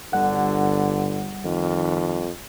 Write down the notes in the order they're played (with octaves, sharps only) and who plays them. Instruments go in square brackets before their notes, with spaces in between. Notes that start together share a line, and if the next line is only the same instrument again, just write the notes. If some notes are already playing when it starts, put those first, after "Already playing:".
[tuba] G1 [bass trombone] D3 [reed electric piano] G3 F#5
[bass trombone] F2 [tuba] D#3